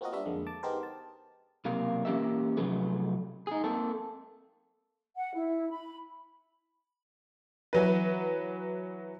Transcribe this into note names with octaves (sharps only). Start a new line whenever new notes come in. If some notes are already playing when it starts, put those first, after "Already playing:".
A#3 C4 F4 F#4 A#4 D#5
G3 B3 D4 F#4 B4 E5
F2 D3 G#3 A#3
A5 D6
B3 D#4 G4 G#4 A#4 C5
A5
B1 C3 A#3 F5
E3 A#3 C#4 G4 A#4 E5
C3 F3 F#3 A3 G#4 B4
D#4 G#4
A#3 C4 A4
F#5
E4
B5
E3 F#3 B4